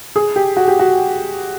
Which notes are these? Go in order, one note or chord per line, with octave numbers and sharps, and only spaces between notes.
G#4
G4
F#4
G4
F#4